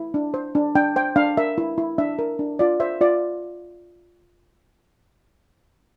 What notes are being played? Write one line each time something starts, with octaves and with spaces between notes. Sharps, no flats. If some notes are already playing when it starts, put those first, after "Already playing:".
Already playing: E4
D4
C5
D4
D4 G5
C5 G5
D4 F5
A#4 E5
E4
E4
D4 E5
A#4
D4
F4 D5
C5 E5
F4 D5